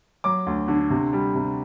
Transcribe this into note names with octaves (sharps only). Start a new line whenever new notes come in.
F#3 D6
D2
D3
C3
G3
C3